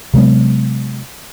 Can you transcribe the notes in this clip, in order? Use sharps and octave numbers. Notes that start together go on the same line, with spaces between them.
C3 F#3 G#3 B3